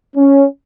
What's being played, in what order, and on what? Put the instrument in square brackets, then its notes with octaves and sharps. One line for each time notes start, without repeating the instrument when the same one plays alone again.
[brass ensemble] C#4